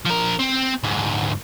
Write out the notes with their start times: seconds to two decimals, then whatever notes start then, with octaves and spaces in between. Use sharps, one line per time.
0.06 F3 A#4
0.40 C4
0.83 D2 G#2